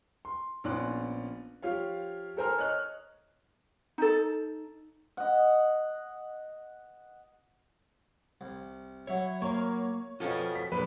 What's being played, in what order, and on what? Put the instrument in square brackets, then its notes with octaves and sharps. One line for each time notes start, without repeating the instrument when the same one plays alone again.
[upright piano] C6
A#1 B3 C#4 D5 C6 F#6
F3 F4 G4 C#5 F5
A4 A#4 C5 G#5 A#5 F6
C#5 D#5 F6 F#6
[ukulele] D#4 A4
[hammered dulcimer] D#5 F#5
[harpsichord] C2
[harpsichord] F#3 E4 [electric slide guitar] C#5
[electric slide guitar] A#3 [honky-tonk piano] C#5
[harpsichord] B2 F3 C#4 [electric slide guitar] F4 A4
[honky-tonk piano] B6
[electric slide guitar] F3 A#3 [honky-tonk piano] B4